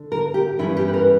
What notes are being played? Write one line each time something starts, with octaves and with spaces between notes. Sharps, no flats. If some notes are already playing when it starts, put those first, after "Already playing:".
Already playing: D3
A#4
G4
G2 E3 G3 C#4 E4
G4
B4
A#4